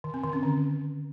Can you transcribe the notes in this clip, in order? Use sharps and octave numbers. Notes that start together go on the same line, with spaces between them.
D#3
C4
D#3
C#4
D3